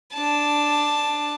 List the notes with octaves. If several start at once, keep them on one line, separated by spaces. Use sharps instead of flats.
D4 A5